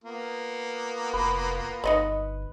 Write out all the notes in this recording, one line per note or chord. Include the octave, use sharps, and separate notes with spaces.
A#3 B3 F4
F1 B4
G1 D#4 D#5 B5